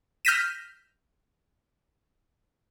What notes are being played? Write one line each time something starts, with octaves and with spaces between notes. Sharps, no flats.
F6 G6 A#6 B6 D#7 E7